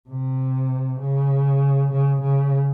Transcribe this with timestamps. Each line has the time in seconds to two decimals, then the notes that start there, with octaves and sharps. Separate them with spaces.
0.09 C3
1.00 C#3
1.92 C#3
2.22 C#3